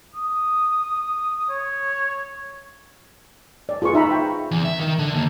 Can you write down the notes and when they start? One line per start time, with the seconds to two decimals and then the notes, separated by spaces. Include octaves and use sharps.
0.15 D#6
1.50 C#5
3.69 D5
3.82 F4 G#4 B4 C#6
3.93 D#4 E5 A#5 B5
4.11 G5
4.51 E2
4.65 E5
4.80 D#3
4.98 D3
5.14 D#2